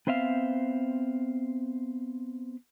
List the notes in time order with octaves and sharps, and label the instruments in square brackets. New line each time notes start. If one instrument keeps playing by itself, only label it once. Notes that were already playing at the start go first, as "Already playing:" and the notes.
[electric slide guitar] B3 C4 C5 E5 F5